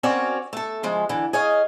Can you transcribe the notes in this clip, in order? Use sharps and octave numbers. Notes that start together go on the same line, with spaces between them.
C4 C#4 F#4 A#4 C#5 D5
A3 A4
C#3 F3 G#3
D3 E3
G#4 C#5 D#5 F5